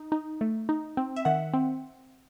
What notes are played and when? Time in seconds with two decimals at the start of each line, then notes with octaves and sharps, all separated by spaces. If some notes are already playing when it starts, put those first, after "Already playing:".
Already playing: D#4
0.12 D#4
0.41 A3
0.69 D#4
0.97 C4
1.16 E5
1.25 D#3 F#5
1.54 C4